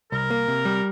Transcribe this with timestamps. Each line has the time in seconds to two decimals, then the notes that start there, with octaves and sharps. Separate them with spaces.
0.12 C2 A#4
0.30 A#3
0.48 C3
0.65 G3